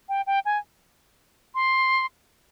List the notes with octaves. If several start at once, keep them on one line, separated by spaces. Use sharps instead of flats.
G5
G5
G#5
C6